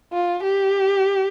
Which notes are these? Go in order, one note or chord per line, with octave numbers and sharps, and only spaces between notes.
F4
G4